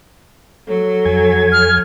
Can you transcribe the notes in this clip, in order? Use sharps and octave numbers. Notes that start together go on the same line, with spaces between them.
F#3 A4
F2 G#5 G#6
F6